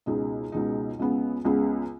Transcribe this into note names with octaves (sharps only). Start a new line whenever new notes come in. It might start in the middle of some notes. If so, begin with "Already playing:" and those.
C#2 B2 G#3 D#4
C#2 B2 G#3 D#4
C#2 C#3 B3 G#4
C#2 C#3 B3 G#4